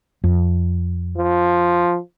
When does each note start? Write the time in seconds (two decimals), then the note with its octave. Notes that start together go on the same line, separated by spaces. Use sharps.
0.24 F2
1.18 F3